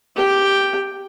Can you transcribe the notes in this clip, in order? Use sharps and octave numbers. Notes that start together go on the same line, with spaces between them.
G4 G5